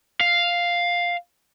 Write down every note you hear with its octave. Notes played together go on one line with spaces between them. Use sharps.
F5